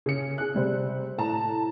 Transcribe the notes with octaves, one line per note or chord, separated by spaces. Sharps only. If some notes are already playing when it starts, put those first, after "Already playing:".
C#3 C#7
G#4 F#6
C3 G3 C5
A2 A5 A#5